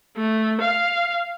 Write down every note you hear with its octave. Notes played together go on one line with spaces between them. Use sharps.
A3
F5